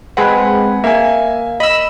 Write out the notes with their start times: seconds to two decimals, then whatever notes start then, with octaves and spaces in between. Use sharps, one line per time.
0.17 G#3 C4 B4 F#5 G#5 B5
0.84 A#3 E5 G#5
1.60 D#5 B5 E6